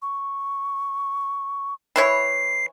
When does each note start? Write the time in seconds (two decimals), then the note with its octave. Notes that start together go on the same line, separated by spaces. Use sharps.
0.02 C#6
1.96 E3 E4 C#5 C7